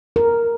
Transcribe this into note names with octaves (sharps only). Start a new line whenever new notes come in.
A#4